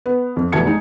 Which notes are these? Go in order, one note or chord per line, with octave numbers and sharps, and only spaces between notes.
B3
F2
F1 B2 E3 A5 G#6 C#7
G#3 D#4